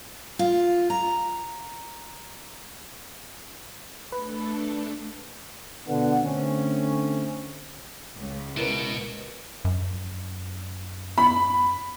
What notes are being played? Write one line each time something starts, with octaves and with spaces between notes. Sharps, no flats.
F4
A#5
A3 D4 A4 B4
B2 D3 B3 F#5
D3 A3 C4 C#4
C#2
B2 E4 A#4 B4
F#2
B5